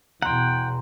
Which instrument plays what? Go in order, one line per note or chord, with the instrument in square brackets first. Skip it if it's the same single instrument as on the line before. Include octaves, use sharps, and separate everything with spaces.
[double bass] E2 B2 [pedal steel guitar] F#5 G5 [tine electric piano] A#5 C6